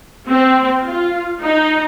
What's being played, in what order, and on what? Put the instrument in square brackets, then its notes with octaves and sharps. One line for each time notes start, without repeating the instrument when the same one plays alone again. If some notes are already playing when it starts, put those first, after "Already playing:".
[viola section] C4
F4
D#4